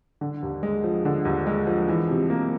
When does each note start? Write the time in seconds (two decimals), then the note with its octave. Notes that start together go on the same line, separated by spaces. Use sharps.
0.21 D3
0.42 D#2
0.63 G#3
0.84 F3
1.05 D3
1.25 D#2
1.47 G#3
1.67 F3
1.88 E3
2.09 C3
2.30 A#3